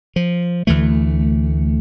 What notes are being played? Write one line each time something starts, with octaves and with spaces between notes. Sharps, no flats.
F3
D2 E3 A3